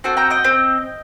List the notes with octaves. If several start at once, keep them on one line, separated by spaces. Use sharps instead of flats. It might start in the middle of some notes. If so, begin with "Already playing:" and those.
C4 F#4 A4
G5 A#5
D#5 G5
C4